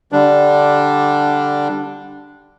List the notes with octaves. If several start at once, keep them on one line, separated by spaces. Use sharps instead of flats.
D3 G3 D4